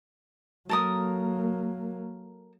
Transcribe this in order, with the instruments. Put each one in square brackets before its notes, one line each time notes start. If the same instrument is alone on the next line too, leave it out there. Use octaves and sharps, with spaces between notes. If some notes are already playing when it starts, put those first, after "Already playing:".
[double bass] F#3 A#3 [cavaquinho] A4 A#4 D#6